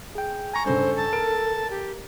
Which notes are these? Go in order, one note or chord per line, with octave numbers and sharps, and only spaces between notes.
G#4 G5
G#5 A#5 C#6
G2 C#3 A4 C5
A5
A#4 D7
G4